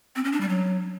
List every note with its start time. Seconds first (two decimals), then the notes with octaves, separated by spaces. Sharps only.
0.16 C4
0.24 C#4
0.32 D4
0.41 G3
0.49 F#3